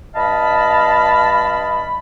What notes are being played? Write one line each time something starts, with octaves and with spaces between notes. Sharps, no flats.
G2 D#5 F5 A5 B5